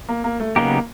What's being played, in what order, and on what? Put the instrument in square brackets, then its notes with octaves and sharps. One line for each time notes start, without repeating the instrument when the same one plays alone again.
[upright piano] A#3
A#3
A3
[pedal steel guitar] C#3 F#3 B3 D#4 G4 [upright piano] A#3